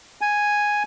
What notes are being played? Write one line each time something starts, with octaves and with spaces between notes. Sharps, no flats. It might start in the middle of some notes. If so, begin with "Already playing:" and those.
G#5